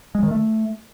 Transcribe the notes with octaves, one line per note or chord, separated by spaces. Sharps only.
G#3
D#3
A3